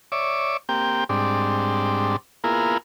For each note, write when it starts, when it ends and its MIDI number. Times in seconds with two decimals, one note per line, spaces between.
0.12 0.57 73
0.12 0.57 74
0.12 0.57 76
0.12 0.57 86
0.69 1.04 58
0.69 1.04 60
0.69 1.04 67
0.69 1.04 79
1.09 2.16 44
1.09 2.16 55
1.09 2.16 60
1.09 2.16 62
2.44 2.78 58
2.44 2.78 59
2.44 2.78 64
2.44 2.78 65
2.44 2.78 68
2.44 2.78 70